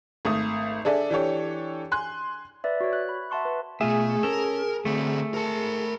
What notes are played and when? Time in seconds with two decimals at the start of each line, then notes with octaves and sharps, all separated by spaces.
0.25 G#1 A3 E5 D#6
0.85 D4 G#4 A4 D5 E5
1.10 E3 D4 G4 A4 C#5
1.92 G#5 C6 F#6
2.64 B4 D5 E5
2.81 F#4 C#5
2.93 F#6
3.09 B5
3.30 E5 F#5 A5 C6 C#6 F#6
3.45 B4
3.81 B2 A3 F4 G#4 E5
4.23 C#4 A4 A#4
4.85 D3 A3 C4
5.34 A#4 A5